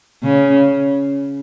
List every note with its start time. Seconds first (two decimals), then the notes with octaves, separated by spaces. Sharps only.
0.23 C#3